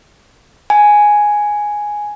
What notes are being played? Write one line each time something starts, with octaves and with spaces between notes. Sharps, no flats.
G#5